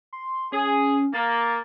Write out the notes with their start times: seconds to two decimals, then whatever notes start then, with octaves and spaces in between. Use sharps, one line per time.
0.13 C6
0.52 C#4 G#4
1.14 A#3 A6